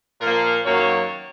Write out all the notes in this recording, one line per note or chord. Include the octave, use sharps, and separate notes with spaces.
A#2 F3 A#3 A#4
F#2 D#3 F#3 A#3 C#5